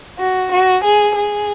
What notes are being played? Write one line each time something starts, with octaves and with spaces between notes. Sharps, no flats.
F#4
F#4
G#4
G#4